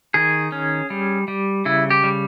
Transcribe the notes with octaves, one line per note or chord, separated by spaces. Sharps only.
D#3 G#4
C#4
G3
G3
C#3 E4
G4
G3